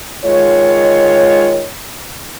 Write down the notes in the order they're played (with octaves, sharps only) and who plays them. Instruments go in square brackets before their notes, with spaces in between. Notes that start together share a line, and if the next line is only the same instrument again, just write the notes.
[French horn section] D#3 G#3 F4 C#5